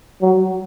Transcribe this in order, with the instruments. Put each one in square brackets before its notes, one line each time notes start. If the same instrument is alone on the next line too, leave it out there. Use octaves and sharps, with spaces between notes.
[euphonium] F#3